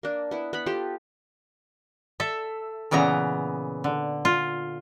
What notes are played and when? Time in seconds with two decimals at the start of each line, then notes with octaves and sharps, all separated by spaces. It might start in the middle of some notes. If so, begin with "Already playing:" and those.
0.03 A#3 D4
0.31 B3 E4
0.53 B3 B5
0.66 F4 G4 A4
2.20 A4 E5
2.91 A#2 C#3 E3 B3 A#5
3.84 D3
4.25 F4